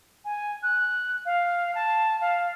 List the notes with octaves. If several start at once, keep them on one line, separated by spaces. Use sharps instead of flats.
G#5
F#6
F5
A5
F5